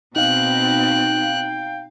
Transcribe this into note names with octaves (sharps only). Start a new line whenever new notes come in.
B2 C4 D#4 F5 G5 F#6